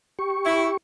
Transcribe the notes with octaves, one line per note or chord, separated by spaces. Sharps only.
G4 C#6
E4